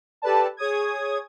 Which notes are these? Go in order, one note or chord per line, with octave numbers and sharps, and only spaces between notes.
G4 A4 B4 D5 A5
G#4 C#5 D#6 G#6